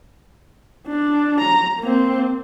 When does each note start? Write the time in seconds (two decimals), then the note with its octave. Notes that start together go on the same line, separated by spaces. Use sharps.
0.88 D4
1.41 A#5
1.79 A#3 C4